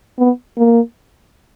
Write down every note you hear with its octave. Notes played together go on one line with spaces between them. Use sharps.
B3
A#3